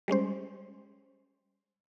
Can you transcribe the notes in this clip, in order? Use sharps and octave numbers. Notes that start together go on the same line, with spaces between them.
G3 G#3 C#4 C5